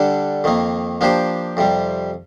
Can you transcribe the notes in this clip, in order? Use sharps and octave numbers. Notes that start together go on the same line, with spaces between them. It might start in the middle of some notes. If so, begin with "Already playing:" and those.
Already playing: D3 G3 D4 A4
F2 D#3 A#3
F3 A#3 D4 G4 C5
F2 C3 G3